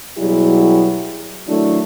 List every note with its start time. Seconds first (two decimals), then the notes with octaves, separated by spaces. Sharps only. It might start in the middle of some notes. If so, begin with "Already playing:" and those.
0.18 B2 F#3 G3 E4 G4 G#4
1.48 D#3 F#3 A3 D4 E4